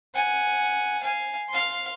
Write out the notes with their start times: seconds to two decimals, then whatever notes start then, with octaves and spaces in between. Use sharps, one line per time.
0.14 F#5 G#5
1.03 F5 G#5
1.49 F5 C6